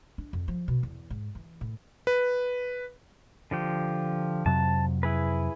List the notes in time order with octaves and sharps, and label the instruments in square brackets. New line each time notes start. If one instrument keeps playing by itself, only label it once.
[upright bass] D4
F2
F3
B2
E2
G#2
E3
A2
[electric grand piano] B4
[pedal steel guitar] D3 F3 G4
[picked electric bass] F2 C3 F#3 [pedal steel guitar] A5
[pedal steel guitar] E4 G#4 B4